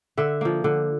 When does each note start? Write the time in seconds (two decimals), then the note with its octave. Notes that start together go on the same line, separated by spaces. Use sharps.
0.17 D3 E5
0.41 F3 A#3
0.64 D3